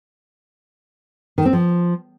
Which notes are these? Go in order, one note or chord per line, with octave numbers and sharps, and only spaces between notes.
D#3
C4
F3